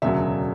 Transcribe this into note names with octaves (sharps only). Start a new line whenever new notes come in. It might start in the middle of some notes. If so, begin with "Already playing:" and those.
E1 D2 C#3 F#3 E5